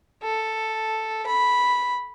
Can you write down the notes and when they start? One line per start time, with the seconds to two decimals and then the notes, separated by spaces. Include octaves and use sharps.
0.23 A4
1.27 B5